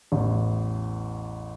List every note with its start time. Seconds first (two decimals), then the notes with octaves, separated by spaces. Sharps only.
0.12 A1 E2